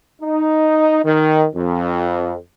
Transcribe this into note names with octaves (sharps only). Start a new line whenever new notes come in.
D#4
D#3
F2